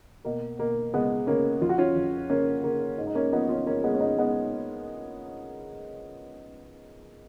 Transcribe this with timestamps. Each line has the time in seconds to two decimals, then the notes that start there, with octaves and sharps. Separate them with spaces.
0.25 B2 A#3
0.59 B2 A#3
0.93 C#2 G#3 B3
1.27 C#2 A#3 C#4
1.61 F2 F4
1.69 F#4
1.78 C#4 F4
1.96 F2
2.30 C#3 A#3 C#4
2.64 C#3 A#3
2.98 G#2
3.07 D#4
3.15 A#3 C#4
3.33 F3 B3 D#4
3.49 C#4 F4
3.67 G#2 A#3 C#4
3.84 G#3 B3
3.94 C#4
4.00 G#2 B3 D#4
4.18 G#3 B3